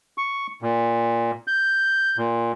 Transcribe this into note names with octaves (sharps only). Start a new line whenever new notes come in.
C#6
A#2
G6
A#2